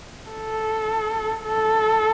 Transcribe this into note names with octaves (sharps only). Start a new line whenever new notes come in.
A4
A4